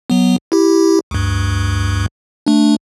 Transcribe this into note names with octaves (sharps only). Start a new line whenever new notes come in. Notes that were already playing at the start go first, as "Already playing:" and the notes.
F#3 B3
E4 G4
D2 G2
A3 D4